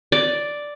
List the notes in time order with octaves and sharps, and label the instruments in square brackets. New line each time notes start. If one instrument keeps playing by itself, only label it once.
[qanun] D5